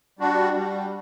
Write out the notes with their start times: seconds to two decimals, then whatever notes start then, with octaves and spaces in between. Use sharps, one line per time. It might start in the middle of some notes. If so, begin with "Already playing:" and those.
0.19 G3 D4 F#4
0.56 G3